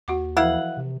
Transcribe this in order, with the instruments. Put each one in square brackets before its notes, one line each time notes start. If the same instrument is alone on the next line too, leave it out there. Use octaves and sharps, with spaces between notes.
[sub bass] D#2 [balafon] F#4 F#5 D6
[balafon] E3 F3 [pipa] E4 F5 F#5
[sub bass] C3